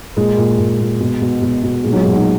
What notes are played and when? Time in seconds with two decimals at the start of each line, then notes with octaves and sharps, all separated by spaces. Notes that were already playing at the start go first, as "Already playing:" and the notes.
0.16 A#2 G#3
0.37 A#2
0.58 A#2
0.80 A#2
1.00 B2
1.22 B2
1.42 B2
1.63 B2
1.84 A#2 G#3
1.93 F#3
1.98 G#3
2.05 A#2
2.12 D#4 F#4